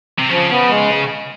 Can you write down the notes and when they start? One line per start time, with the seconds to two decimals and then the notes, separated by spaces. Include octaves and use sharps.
0.19 C3
0.30 C#3 F3
0.50 B3
0.70 G#3